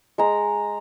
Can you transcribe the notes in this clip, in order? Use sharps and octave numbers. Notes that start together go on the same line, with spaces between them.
G#3 A#5